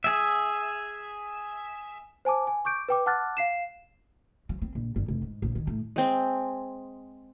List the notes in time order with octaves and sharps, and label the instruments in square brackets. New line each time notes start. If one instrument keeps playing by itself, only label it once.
[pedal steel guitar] G#4 E5
[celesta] C5 G#5 A5 D6
G#5
C#6 D6 G6 D7
B4 G5 D6
F#5 A5 D6 F6 F#6 A6
F5 C7 E7
[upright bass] F#3
C4
A#1
G1
F1
G#2
A#1
D#3
A2
[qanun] G#3 C4